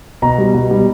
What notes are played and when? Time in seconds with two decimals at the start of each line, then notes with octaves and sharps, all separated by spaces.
0.22 B2 A#5
0.38 G3
0.54 B2
0.71 G3